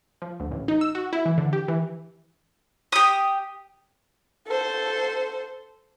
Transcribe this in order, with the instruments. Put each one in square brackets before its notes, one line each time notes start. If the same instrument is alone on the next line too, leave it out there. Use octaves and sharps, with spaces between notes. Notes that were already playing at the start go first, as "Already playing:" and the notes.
[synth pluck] F3
D2
A1
D#4
E6
F#4
E4
E3
D3
G4
E3
[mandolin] G4 D#6
[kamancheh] A4 C5